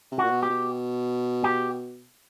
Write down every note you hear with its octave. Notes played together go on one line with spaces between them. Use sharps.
C3
F#4
A#2
B2
G4
B2
G4